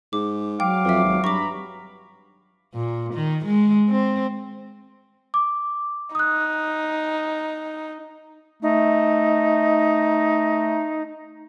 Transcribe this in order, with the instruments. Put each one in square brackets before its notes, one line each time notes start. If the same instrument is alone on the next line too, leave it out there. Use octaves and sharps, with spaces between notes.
[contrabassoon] G#2 [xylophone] D6
[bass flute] F#3 [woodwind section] F5 D6 [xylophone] G5
[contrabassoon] F2 [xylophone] B4 E5
[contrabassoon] G#1
[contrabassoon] G2 [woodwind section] A#5 B5 [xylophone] C#6 D6
[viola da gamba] A#2
D#3
G#3
C4
[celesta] D6
[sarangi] D#4 [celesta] D#6 F#6
[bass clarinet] A3 [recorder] D#4